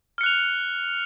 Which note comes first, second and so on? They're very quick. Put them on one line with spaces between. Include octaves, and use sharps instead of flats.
F6 C#7 F#6 F7